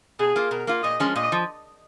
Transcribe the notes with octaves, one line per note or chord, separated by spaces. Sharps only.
B2 G#4
A#3 F4
B2 A#4
A#3 F4
A#2 D#5
F3 G#3 C#4
A#2 D#5
F3